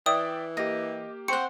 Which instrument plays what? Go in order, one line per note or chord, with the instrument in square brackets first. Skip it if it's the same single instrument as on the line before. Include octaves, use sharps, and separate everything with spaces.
[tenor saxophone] E3 [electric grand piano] D5 E5 G5 [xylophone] D#6
[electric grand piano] A#3 G4 [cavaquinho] D#5
[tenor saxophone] C4 [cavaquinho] C5 F#5 [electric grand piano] C#6 [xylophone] C#7